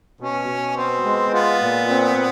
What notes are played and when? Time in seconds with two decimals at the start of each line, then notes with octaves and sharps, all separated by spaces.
0.20 B2 C#4
0.49 B2
0.77 B3 C4
1.04 G#3
1.33 B3 F4
1.61 A#2
1.89 C4